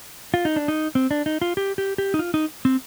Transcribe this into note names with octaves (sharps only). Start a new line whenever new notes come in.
F4
D#4
D4
D#4
C4
D4
D#4
F4
G4
G4
G4
D#4
F4
D#4
C4